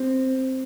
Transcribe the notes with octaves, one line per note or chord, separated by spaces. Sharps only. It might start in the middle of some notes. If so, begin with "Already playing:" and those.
Already playing: C4